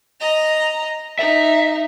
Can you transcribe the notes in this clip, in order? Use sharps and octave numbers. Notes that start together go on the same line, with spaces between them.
D#5 A#5
D#4 E5